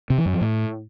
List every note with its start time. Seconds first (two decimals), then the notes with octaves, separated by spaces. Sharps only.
0.10 C3
0.18 E3
0.26 F#2
0.33 F3
0.41 A2